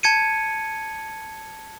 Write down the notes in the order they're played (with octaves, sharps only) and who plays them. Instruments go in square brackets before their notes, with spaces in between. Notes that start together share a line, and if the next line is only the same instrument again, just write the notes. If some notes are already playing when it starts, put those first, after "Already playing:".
[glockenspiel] A5 G#6 C#7 D#7